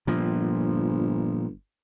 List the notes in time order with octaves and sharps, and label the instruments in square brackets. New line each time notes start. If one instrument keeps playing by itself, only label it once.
[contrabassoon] G1 [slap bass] A#2 F3